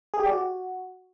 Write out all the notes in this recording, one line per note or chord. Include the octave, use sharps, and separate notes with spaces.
G#4
G4
D5
F#4